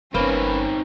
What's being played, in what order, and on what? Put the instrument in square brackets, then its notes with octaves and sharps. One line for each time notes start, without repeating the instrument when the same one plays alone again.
[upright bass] G1 [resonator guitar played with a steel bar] A#3 B4 [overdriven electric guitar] C4 D#4 [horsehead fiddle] C#4